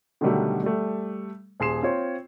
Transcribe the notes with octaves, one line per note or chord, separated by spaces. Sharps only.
B2 D3 D#3 F#3 G3 A3
G3 A3
D#1 G#4 C6 C7 E7
C4 F4 C#5